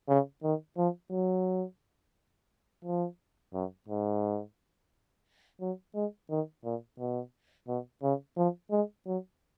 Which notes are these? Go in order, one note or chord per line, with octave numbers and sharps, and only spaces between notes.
C#3
D#3
F3
F#3
F3
F#2
G#2
F#3
G#3
D#3
A#2
B2
B2
C#3
F3
G#3
F#3